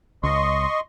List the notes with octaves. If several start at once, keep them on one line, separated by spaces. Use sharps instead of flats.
C#2 D#5 C6 C#6